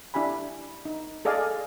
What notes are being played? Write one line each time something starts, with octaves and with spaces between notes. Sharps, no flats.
D4 E4 G4 G#5 B5
D#4
G#4 A4 D5 D#5 F5 G#5